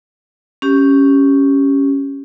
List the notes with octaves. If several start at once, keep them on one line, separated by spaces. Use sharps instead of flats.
C#4 G4